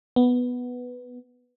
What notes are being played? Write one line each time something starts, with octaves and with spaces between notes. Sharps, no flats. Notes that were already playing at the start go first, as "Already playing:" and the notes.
B3